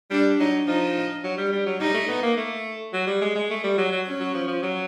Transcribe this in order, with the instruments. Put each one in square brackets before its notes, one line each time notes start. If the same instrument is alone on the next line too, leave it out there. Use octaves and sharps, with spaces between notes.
[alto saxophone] G3 [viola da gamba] D4
[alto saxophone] F#3 [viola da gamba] D#4
[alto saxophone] F3 [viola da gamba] D#4
[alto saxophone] F#3
G3
G3
F#3
[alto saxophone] G3 [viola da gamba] D#4
[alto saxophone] A3
B3
A#3
A3
F#3
G3
G#3
G#3
A3
G3
F#3
F#3
[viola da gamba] C#4
[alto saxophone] F#3
F3
F3
F#3